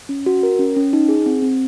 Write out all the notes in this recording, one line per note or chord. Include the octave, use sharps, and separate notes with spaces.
C#4
F#4
A#4
C#4
C#4
D#4
G#4
C4
C4